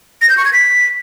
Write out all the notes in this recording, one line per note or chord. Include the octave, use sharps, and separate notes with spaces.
A#6
G6
C#6
G#6
B6